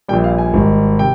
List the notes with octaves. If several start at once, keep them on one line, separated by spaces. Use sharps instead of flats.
A#1 A#2 G3 G5
F5
G#5
G#1 G#2 G3
C3 G5